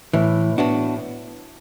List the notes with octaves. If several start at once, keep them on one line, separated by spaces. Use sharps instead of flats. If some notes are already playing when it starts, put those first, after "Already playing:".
A2 E3
A2 B3 D4 F#4